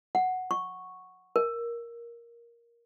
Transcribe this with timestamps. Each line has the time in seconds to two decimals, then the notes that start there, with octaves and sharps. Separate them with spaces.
0.15 F#5
0.51 C#6
1.36 A#4